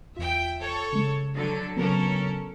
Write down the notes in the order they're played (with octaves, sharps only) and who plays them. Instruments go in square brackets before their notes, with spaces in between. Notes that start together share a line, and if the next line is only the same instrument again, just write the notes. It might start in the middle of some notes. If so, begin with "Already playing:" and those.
[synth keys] E2 F4 [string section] E5 G5
[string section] A4 C#5
[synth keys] C#3 G#3
[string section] D3 F#3 A4
[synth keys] C#3 F#3 B3 [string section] C#4 A4 A#4